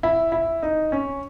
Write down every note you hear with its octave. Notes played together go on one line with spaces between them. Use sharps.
E4
E4
D#4
C#4